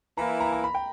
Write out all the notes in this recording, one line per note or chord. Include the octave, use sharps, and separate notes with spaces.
E3 A#3 E4 A#5
A#5
A#5
B5
G5